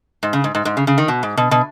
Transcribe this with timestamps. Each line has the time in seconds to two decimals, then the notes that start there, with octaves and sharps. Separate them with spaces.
0.23 G#2
0.33 C#3
0.44 G#2
0.55 G#2
0.65 G#2
0.77 C#3
0.87 C#3
0.98 D#3
1.08 B2
1.23 G#2
1.37 B2
1.51 B2